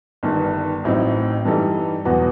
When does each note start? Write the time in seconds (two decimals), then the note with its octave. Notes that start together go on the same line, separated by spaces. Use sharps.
0.23 G1 G2 D#3
0.84 A1 A2 F#3 C4 D#4
1.45 G2 E3 G3 D#4 A4
2.05 E2 B2 F#3 B3 F#4